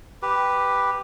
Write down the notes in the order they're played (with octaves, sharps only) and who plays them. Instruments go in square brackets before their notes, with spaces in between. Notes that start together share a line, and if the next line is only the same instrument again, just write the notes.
[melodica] G4 B4